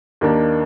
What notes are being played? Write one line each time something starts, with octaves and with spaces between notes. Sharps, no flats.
D#2 D#3 A#3 D4